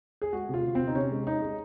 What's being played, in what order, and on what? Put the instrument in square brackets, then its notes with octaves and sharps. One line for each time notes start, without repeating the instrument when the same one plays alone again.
[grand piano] G#4
G#3 F#4
C3 F4
C3
C3 C4
D#4
C3 C#4
G#3
G#3 D#4
G#3